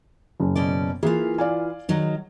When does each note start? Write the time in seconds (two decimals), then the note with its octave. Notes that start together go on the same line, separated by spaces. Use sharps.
0.40 F#1
0.56 B2 C#4 D5
1.03 E3 A#3 F4 G#4
1.38 D5 F5 G#5
1.89 D#3 F#3 D#4